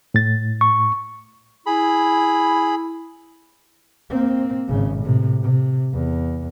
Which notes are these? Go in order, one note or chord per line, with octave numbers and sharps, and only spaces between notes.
A2 A6
C#6
E4 G#4 B5
A#3 C4
G#1 C#3
A2 C3
C3
E2